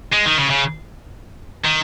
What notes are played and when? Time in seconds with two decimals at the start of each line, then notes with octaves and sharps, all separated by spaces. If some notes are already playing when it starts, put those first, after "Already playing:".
0.12 G#3
0.25 D#3
0.38 C#3
0.50 C#3
1.64 D#3